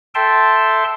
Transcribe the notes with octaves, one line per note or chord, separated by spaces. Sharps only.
A4 E5 G5 A5 C6